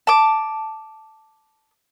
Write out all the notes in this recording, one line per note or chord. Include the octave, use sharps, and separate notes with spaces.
A5 D6